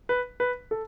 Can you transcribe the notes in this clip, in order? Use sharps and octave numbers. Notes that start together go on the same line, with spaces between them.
B4
B4
A4